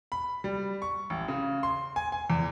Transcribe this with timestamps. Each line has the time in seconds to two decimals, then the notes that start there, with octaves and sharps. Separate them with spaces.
0.12 B5
0.44 G3
0.82 C#6
1.10 A1
1.28 C#3
1.63 C6
1.96 G#5
2.12 G#5
2.30 E2